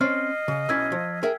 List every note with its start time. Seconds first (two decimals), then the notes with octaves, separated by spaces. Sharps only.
0.01 C4 C#4 D5 D#5 F6 C7
0.48 C#3
0.69 B1 C#4 E4 E6 G#6 B6
0.92 F3
1.23 G#4 A#4 E5 G5